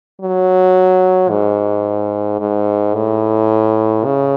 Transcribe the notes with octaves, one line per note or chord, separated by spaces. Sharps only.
F#3
G#2
G#2
A2
C#3